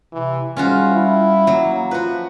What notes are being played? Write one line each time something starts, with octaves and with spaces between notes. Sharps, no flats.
C3 E3
G#2 G3 C#4 F4 F#4
E4
F#3 A#3
F3 F#4 B4